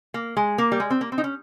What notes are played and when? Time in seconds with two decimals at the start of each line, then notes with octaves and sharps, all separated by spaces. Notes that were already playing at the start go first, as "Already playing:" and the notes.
0.14 A#3
0.37 G#3
0.58 A#3
0.72 G3
0.80 G#3
0.90 C4
1.01 A#3
1.12 C4
1.18 D#4
1.24 C#4